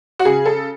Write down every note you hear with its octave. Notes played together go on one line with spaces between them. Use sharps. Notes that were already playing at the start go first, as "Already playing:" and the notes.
F#4
C#3 G#4
A4